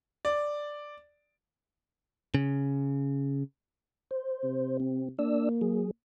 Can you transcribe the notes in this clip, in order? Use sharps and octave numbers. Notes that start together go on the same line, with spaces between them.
D5
C#3
C5
C3
C4
A#3 D4 D5 E6
F#3 G#4